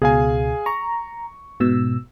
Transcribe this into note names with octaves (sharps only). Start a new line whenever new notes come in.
C#2 B2 G#4 F5 G#5
A#5 C#6
G#2 B2 E6